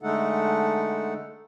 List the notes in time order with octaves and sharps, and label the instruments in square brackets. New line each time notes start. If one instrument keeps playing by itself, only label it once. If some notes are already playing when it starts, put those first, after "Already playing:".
[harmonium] D3 G#3 A3 D#4 A4 F#5